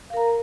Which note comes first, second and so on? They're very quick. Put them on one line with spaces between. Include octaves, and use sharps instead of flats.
F5 A#4 A#5